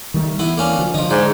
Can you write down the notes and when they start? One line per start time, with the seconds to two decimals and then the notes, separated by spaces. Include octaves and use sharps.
0.14 D#3 G3 A3
0.39 E3 B3 E4
0.57 A#3 C#4 D4
0.78 D3 F3 F#3
0.94 D3 F3 D#4
1.10 G#2 D5